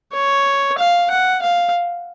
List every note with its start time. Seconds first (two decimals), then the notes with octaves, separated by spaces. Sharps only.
0.13 C#5
0.78 F5
1.11 F#5
1.42 F5